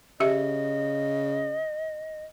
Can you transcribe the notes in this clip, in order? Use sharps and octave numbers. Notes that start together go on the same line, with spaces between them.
C#3 G4 D#5 E5